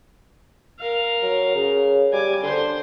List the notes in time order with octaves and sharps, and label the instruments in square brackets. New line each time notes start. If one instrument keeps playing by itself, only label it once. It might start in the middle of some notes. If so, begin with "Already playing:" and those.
[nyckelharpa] A#4 F5
[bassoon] F#3
C#3
[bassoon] G3 [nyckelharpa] G#5 D6
[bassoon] D3 [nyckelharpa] C5 C6